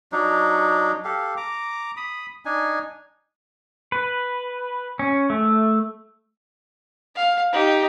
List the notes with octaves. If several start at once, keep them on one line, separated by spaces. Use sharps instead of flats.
F#3 D4 D#4
G4 A4 F5
A#5 D6
B5 D#6
D4 D#4 G#5
B4
C#4
A3
F5
D#4 G4